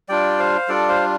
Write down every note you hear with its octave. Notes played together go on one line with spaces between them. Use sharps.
G3 D4 F4 D5 G5
C5 F5
G3 D4 F4 A4 D5
C5 F5